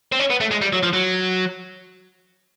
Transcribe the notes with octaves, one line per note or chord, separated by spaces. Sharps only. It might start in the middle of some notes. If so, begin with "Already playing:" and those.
C4
C#4
B3
A3
G#3
G3
F#3
F3
F#3